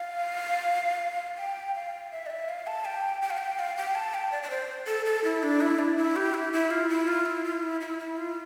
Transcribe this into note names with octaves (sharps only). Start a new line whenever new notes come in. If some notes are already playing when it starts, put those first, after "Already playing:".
Already playing: F5
G5
F5
E5
D5
E5
F5
A5
G5
G5
F5
G5
F5
G5
A5
G5
D5
D5
C5
A4
A4
E4
D4
E4
D4
E4
G4
E4
E4
F4
E4
F4
E4
F4
E4
E4
E4
F4